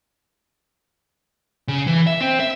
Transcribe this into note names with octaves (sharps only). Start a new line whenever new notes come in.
C#3
E3
E5
C4
E5